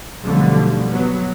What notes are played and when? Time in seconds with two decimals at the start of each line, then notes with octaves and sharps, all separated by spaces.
0.22 B1 F2 D3 G3 A3
0.90 F#3 B3